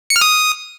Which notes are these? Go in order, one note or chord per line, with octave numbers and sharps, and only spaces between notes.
C#7
F6
D#6